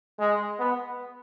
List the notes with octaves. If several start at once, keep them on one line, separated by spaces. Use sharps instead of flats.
G#3
B3